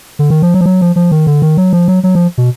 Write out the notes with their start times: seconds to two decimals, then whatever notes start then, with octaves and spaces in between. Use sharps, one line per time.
0.19 D3
0.30 D#3
0.42 F3
0.54 F#3
0.61 F3
0.66 F#3
0.81 F3
0.96 F3
1.11 D#3
1.27 D3
1.42 D#3
1.57 F#3
1.73 F3
1.88 F#3
2.04 F#3
2.15 F3
2.38 B2